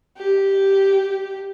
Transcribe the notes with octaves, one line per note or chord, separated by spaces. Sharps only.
G4